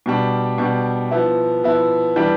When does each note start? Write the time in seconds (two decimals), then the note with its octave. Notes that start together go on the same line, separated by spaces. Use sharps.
0.06 B2 G3 D4
0.58 B2 G3 D4
1.11 F3 B3 E4
1.63 F3 B3 E4
2.16 E3 G3 D4